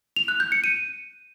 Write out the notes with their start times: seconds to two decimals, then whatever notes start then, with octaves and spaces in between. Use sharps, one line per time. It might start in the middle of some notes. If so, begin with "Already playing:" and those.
0.16 F7
0.28 F#6
0.40 G6
0.52 C#7
0.64 D#7